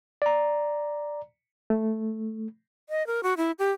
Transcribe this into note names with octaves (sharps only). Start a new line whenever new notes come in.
D5 A#5
A3
D#5
A#4
F#4
E4
G4